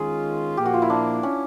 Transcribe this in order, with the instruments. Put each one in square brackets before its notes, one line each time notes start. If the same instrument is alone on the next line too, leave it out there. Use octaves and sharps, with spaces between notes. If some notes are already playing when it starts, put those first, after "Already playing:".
Already playing: [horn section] D#3 G#3 C#4 F4 [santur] G#4
[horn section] A#2 F3 A#3 [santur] G4
[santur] F#4
F4
E4
D4
C#4